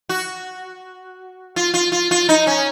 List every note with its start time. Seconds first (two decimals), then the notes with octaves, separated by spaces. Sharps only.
0.09 F#4
1.56 F4
1.74 F4
1.92 F4
2.11 F4
2.29 D#4
2.47 C#4